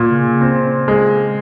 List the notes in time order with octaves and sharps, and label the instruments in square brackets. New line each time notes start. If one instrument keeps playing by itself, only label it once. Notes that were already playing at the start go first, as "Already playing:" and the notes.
Already playing: [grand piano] A#2
[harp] C#3
[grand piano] C4
G#3